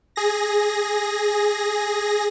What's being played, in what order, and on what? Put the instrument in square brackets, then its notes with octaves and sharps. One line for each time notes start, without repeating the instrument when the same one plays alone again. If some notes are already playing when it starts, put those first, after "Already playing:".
[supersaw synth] G#4 A#6